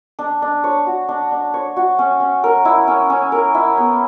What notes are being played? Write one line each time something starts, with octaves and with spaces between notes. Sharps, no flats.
D4
D4
C#5
F#4
D4
D4
C#5
F#4
C#4
C#4
A#4
E4
C#4
C#4
A#4
E4
B3